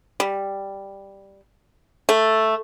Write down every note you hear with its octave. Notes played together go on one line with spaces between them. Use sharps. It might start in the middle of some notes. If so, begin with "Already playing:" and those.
G3
A3